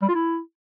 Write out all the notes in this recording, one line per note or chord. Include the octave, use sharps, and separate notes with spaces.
G3
F4
E4